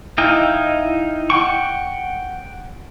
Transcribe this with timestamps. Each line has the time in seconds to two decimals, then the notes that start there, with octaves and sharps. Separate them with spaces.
0.18 D#4 E4 D#5 F5 G5
1.30 F#5 G5 C#6